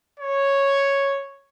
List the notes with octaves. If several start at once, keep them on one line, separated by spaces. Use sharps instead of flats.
C#5